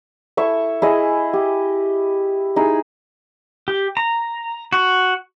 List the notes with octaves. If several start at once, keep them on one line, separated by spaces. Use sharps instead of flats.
E4 A4 E5 C#6
E4 G#4 D#5
G4
D#4 E4 G#4
G4
A#5
F#4